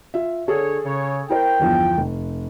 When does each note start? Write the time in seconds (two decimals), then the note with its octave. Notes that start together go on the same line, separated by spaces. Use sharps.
0.14 F4 E5
0.48 D3 G#4 A4 C#5
0.85 C#3 C#5
1.29 E4 A#4 C5 G5
1.60 G1 E2 F3
1.98 F1